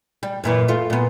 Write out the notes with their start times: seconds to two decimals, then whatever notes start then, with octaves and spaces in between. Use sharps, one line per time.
0.23 G3
0.44 F#2 A#2 E3
0.68 A3 F4
0.90 A#2 B3